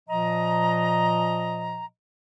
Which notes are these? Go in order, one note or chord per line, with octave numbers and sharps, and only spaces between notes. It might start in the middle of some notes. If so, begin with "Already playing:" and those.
A#2 F3 D#5 A#5